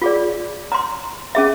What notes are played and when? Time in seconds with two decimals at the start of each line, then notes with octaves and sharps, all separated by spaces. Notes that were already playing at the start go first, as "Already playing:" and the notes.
0.02 F4 G#4 D5
0.72 A#5 C6
1.35 C#4 G#4 E5